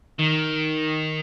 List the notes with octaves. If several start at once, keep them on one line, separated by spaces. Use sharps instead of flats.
D#3